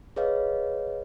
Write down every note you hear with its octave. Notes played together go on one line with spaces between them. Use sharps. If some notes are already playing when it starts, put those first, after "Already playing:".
G#4 B4 C#5 D#5 F5